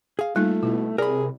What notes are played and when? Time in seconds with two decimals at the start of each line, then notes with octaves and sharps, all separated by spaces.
0.19 G#4 F5
0.36 G3 A3 A#3 D#4 F4
0.63 B2 E4
0.98 C3 G#4 A#4 D5 B5